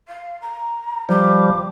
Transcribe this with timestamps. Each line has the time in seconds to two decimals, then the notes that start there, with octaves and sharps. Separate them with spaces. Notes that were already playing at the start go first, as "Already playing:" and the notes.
0.07 F5
0.41 A#5
1.09 F3 G3 D6